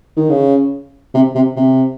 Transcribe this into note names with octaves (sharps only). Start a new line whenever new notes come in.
D#3
C#3
C3
C3
C3